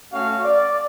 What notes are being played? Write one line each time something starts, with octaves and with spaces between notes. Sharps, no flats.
A3 C#4 F#4 F5
D5